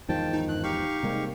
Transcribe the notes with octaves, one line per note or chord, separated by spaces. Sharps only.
E2 G#2 D#3 F3 G5 A5
D#4
G2 F#6
D#4 G4 F5 C#6
G#2 C3 G3 A#3